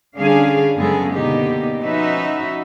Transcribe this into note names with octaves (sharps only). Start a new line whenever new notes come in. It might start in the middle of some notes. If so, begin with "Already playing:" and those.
D3 G3 C#4 D4 G#4 F5
F#2 C#3 G#3 B3 G#4 A4
B2 D3 A#3 B3 D#4 G4
F3 C#4 D#4 F#4 B4 E5